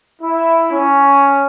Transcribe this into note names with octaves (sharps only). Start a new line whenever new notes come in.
E4
C#4